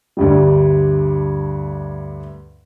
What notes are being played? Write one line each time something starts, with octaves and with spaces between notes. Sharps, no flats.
D2 G2 G3